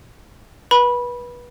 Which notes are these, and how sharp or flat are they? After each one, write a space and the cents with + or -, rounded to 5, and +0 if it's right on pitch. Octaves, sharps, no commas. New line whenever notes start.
B4 -25 B5 -15